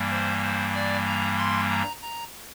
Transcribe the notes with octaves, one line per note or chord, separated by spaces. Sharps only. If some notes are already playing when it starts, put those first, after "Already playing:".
Already playing: G2 E3 G3 A#3
C5
C5
D5
A#5
C6
A#5
A#5